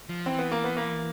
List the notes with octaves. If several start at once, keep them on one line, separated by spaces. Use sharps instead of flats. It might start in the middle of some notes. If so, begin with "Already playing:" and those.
F3
E3 C4
B3
A#3
B3
A#3